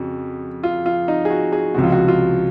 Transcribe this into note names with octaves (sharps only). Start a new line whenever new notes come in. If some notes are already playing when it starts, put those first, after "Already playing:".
Already playing: F2 C#3 F#4
F4
F4
D#4
G#4
F#4
G#4
C#2 C3 F3 F#4
F4
F#4
F4